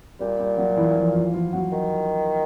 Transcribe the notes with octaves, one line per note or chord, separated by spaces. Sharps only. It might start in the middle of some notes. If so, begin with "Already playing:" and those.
A#2 G3 G4
G3 G4
F#3 F#4
E3 E4
F3 F4
F3 F4
F3 F4
F#3 F#4
D#3